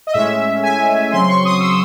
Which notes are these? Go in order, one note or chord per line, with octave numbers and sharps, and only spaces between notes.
D#5
A2 G#3 C#4 E5
G#5
C#3 F#3 C4 C6
C#6
D#6
E6